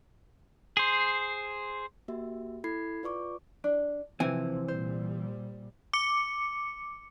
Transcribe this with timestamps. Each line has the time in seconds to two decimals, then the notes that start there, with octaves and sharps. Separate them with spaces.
0.77 G#4 C5
2.08 A#3 F#4 G4 E5
2.64 E4 A4 B5 G#6 C7
3.03 F4 B4 D5 C#6 D6
3.64 D4
4.20 C3 E3 F3 C4 G#5
4.68 A#2 G3 C5
5.93 D6 C#7